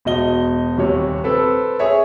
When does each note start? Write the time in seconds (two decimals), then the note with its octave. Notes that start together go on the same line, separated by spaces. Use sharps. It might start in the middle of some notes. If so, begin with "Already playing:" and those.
0.05 E1 B2 D#5 G7
0.77 D#1 C3 C#5
1.24 C4 A4 B4
1.79 G#4 C#5 E5